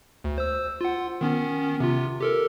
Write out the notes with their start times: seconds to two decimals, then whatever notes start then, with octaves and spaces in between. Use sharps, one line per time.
0.24 D2
0.38 C5 E6
0.81 F4 F#5
1.21 D#3 B3 C#4
1.80 C3 F4
2.21 G4 A4 A#4